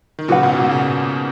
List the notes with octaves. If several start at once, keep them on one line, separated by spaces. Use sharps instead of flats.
D#3
A#2 C#3 F#4 B4 F#5
G#2 B2
G#2 B2
A#2 C#3